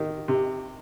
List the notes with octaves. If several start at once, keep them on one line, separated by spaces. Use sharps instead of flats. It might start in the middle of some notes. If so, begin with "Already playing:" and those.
Already playing: D#3
C3